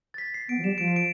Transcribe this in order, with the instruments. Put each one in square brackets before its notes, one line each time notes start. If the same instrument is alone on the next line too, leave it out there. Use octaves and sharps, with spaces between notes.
[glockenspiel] A6
B6
C7
[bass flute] B3 [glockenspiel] D7
[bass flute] F3
[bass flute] G3 [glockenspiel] E7
[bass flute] F3 [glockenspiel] D7
[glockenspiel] C7
D7